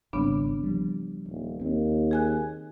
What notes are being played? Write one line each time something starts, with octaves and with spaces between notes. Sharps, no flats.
G#1 C#3 G3 B3 C4 D4
F3 G3
D#1
D#2 C4
G#4 G#5 F#6